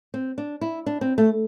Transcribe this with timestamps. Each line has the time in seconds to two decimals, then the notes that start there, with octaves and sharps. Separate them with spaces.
0.14 C4
0.38 D4
0.61 E4
0.86 D4
1.01 C4
1.18 A3